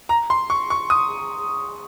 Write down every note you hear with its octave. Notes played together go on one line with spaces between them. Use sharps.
A#5
C6
C#6
C#6
D#6